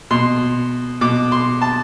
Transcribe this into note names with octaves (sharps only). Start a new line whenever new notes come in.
B2 C6
B2 D6
C6
A5